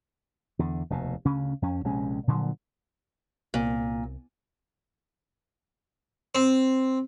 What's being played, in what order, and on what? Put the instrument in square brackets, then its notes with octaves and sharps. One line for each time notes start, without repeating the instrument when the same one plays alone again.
[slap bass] E2 D3
F1 D#2 B2
D2 C#3 C#4
F2 C#4
A#1 C3 G#3 C#4
A#2 D3 F3 F#3
[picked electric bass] C2 [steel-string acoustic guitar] A#2
[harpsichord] C4